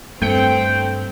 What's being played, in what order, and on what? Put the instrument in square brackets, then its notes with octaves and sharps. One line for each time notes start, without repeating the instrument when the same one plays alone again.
[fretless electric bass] G2 [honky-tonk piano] A3 G6 C#7 [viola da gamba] C4 [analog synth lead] G5